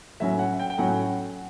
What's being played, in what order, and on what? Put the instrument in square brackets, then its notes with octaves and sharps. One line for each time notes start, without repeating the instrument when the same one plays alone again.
[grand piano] A2 F#3 C#4 E5
F#5
G5
G5
A2 F#3 C#4 F#5